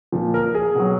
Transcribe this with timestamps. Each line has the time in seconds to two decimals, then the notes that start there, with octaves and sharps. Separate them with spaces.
0.12 A#2 F3
0.34 A#4
0.55 G#4
0.75 B2 F#3